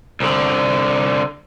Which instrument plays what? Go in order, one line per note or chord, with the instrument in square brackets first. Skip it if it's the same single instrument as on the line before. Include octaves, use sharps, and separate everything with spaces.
[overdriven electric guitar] C2 D3